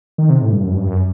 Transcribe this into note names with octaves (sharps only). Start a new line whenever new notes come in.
D#3
C3
A2
G2
F#2
G2
F#2